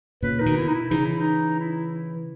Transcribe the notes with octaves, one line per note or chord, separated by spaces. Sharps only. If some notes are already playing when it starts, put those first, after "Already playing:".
A#2 C#3 B4
D#4
B2 D#3
E4
D#4
E4
C#3 E3 D#4
E4
D#4
E4